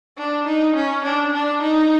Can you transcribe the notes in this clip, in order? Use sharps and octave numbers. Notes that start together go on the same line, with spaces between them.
D4
D#4
C#4
D4
D4
D#4